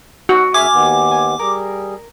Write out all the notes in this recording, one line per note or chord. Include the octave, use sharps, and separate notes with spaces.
D#4 F#4 E6
F#2 G#4 E5 G#5 C6 D6 F6
D#2 D#3 B3
G#5
G3 G#4 A#4